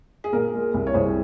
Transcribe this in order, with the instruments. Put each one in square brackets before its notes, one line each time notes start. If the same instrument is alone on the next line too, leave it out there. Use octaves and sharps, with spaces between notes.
[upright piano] G#4
A#2 A#4
G#3
C2
C#5
C2 G#4 C5